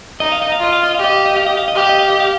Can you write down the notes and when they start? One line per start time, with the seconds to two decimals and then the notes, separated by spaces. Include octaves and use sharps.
0.20 D#4 D#5
0.32 F5
0.42 D#5
0.52 F5
0.60 F4 D#5
0.73 F5
0.83 D#5
0.95 G4 F5
1.04 D#5
1.16 F5
1.26 D#5
1.36 F5
1.47 D#5
1.57 F5
1.68 D#5
1.76 G4 F5
1.89 D#5
1.99 F5
2.10 D#5
2.20 F5